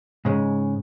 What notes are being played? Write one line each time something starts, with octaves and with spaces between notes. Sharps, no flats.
G#2 C#3 G#3